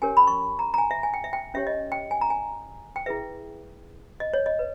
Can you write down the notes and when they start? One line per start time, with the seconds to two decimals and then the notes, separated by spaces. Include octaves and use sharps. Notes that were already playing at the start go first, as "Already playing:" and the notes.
0.02 C#4 G4 A#4 C#5 G#5
0.17 B5
0.27 C#6
0.59 A#5
0.74 A#5
0.78 G#5
0.91 E5
1.03 G#5
1.14 G5
1.24 E5
1.33 G5
1.54 C#4 G4 C#5 E5
1.67 D#5
1.92 G5
2.11 G#5
2.21 A#5
2.30 G#5
2.96 G5
3.06 E4 G#4 B4 E5
4.20 D#5
4.34 C#5
4.46 D#5
4.59 B4